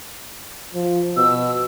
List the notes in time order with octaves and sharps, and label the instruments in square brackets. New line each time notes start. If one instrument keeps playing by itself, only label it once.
[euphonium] F3
[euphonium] B2 [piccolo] E6